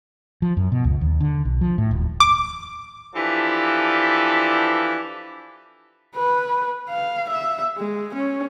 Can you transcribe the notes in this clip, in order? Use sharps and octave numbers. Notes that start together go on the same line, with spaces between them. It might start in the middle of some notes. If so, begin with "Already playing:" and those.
F3
F#2
B2
C#2
D#2
D3
B1
F3
A2
D#1
D6
E3 F3 D4 G4 A4 B4
B4
F5
E5
G#3
C#4